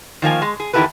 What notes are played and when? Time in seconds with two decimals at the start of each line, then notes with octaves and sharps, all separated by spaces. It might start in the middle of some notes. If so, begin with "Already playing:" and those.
0.22 D#3 F3 A#3 G#5
0.42 G#3
0.60 G#4
0.73 E2 D#3 E4 G4 A4 B4